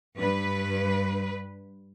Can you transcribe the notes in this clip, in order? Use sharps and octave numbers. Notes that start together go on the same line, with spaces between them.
G2 B4